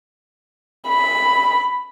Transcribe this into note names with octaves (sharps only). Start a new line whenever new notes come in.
B5